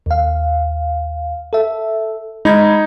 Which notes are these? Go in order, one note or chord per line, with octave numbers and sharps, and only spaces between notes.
D#2 F5
A4 E5
G#3 D#4 B5 G#6